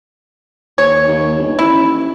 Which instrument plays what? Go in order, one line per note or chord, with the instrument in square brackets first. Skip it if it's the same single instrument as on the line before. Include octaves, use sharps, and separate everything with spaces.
[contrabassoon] D#2 [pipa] C#5
[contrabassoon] D#2
G1
[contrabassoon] A1 [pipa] E4